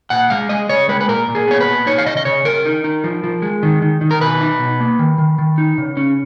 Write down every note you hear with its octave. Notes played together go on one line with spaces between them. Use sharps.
A#2 F#5
G#3 F5
G#3 D#5
C#3 C#5
G#3 B4
B4
A#2 A#4
A#2
G#4
B3 C#5
B4
A#2
D#4 C#5
F5
C#3 D#5
D#5
C#3 C#5
C#3 A#4
D#4
D#4
F3
F3
G#3
D#3
D#3
D#3
A#4
B2 B4
D#4
B2
A#3
D#3
D#3
D#3
D#4
C#3
C#4